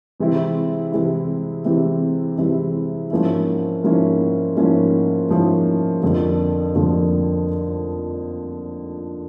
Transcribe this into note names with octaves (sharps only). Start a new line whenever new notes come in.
C3 E3 G#3 C4 E4
C3 E3 G#3 C4 E4
C3 E3 G#3 C4 E4
C3 E3 G#3 C4 E4
G#2 F3 A#3 C#4 E4
G#2 F3 A#3 C#4 E4
G#2 F3 A#3 C#4 E4
G#2 F3 A#3 C#4 E4
F2 D3 F3 A#3
F2 D3 F3 A#3